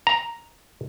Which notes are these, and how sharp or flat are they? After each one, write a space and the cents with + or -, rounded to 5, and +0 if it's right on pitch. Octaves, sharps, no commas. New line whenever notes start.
A#5 +5